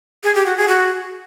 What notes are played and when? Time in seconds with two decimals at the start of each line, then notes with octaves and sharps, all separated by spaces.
0.24 G#4
0.35 G4
0.46 F#4
0.57 G#4
0.68 F#4